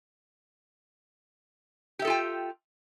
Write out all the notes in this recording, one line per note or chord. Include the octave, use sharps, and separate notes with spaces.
F4 G4 A4 E5 G5